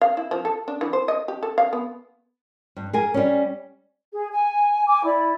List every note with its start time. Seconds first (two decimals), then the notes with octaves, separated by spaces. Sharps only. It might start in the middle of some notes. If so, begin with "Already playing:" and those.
0.02 F5
0.17 E4
0.31 F3
0.45 A4
0.68 D4
0.81 E3
0.93 C5
1.08 D#5
1.28 G4
1.43 A4
1.58 F5
1.73 B3
2.77 G2
2.93 G#4 A#4 G#5
3.14 G3 C#4
4.12 G#4
4.31 G#5
4.87 G#5 D6
5.04 E4 D5